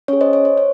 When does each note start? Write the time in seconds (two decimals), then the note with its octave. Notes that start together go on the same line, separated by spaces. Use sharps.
0.08 C#4 G#4 C#5
0.21 C5 D#5
0.33 C#5
0.45 C5
0.58 C#5